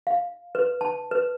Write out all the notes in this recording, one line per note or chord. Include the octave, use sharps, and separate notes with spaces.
F5
B4
A5
B4